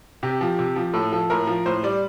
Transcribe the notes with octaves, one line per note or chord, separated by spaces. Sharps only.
C3 G4
F3
C3
F3
A2 A4
F3 A4
A2 A#4
F3
A2 C5
G3 D5